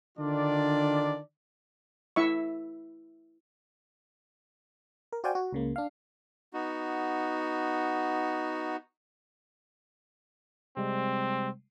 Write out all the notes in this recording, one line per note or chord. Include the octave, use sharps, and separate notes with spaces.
D3 D#3 D4 F4 D5
E4 E5 C#6
A#4
F#4 C5 D5 F5 G5 G#5
F#4
C#2 C#3 A#3
D4 F5
B3 D#4 F#4
C3 G3 G#3 C4